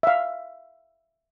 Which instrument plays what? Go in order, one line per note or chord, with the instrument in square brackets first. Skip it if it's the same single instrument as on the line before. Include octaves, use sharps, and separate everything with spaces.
[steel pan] E5 F5